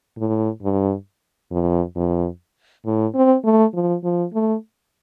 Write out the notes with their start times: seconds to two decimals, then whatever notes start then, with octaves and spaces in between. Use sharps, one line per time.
0.18 A2
0.62 G2
1.51 F2
1.96 F2
2.85 A2
3.15 C4
3.44 A3
3.74 F3
4.04 F3
4.34 A3